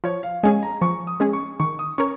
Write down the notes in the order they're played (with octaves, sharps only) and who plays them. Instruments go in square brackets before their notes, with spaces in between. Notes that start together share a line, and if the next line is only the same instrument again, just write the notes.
[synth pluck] F3 [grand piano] C#5
[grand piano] F5
[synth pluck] G#3 C#4 G#4 [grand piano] G#5
[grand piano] A#5
[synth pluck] F3 [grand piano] C#6
[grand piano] D#6
[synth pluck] G#3 C#4 G#4
[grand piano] C#6
[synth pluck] D#3 [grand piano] C#6
[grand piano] D#6
[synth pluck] C#4 A#4 C#5 [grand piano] C#6